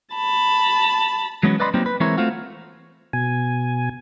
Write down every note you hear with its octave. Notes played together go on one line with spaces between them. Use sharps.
A5 B5
E3 F#3 G#3 B3 C#4
B4 D5 D#5 B5 C6
F#3 G3 A#3 C4 D#4 G4
B4
E3 G#3 C4 E4 A#4 C#5
A3 C4 F4 F#4
B2 G#5